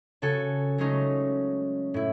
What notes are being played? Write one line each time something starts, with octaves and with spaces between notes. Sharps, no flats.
C#3 F#4 A4 G#5
F#3 G#3 A3 C#4 D#4
A2 E4